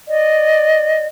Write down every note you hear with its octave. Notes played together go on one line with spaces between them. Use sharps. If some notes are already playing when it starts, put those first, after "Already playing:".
D5 D#5